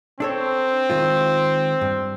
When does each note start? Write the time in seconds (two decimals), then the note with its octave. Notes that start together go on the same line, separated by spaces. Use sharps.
0.20 C4 D4 A4 C#5
0.90 D#3 G#3 F4
1.81 G2